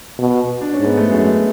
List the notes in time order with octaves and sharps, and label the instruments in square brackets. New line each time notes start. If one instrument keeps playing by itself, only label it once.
[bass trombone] B2
[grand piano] D4
C#4
[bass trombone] G#2
[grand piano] B3
A3
[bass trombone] F#2 [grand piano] G#3